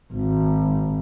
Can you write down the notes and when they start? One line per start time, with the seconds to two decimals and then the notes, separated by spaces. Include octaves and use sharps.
0.13 G#1